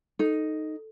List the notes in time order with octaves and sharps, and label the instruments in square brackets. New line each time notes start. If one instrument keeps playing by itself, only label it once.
[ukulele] D#4 [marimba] A4